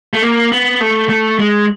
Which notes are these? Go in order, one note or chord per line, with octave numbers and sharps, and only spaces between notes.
A3
A#3
B3
A3
A3
G#3